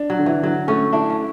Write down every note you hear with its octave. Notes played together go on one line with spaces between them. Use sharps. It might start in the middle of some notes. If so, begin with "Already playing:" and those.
Already playing: D4
F#3
D3
E3
D3 F#3
A3 C#4
D4 E4
C#4